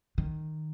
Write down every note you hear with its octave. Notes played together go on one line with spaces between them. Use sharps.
D#3